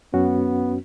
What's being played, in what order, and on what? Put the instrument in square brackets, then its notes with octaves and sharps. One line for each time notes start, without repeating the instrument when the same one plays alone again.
[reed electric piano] F#2 C#4 F#4 [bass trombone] B3